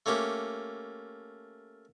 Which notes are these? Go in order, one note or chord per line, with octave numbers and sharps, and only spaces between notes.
A3 A#3 C#4 G4